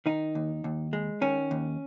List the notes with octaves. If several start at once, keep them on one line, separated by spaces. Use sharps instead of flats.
D#3 D#4
D#2
D#2
G#3
D#3 C#4
D#2